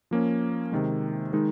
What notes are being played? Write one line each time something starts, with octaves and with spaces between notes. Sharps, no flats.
F3 A#3 C#4
C3 D#3 G#3
D#3 G#3 D#4